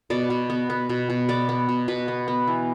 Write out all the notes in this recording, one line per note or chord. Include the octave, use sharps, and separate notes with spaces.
B2 D5
B2
B3
B3
B2
B2
B3 D5
B3
B2
B2 B4
B3
B3
E3